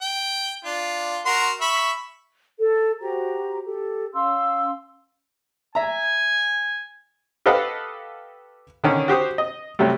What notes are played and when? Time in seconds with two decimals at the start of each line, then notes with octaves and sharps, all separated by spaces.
0.01 G5
0.65 D4 F4
1.26 F#4 A#4 C6
1.61 E5 B5 C#6
2.58 A4
3.00 F#4 G4 C5 A#5
3.64 G4 A4
4.13 C#4 F5 C6 E6
5.75 E5 G#5 A#5
7.46 G4 A4 B4 D#5 F5 F#5
8.84 D3 D#3 C#4
9.08 F#4 G4 C5 D#6
9.38 D#5
9.79 C3 F#3 G3 A3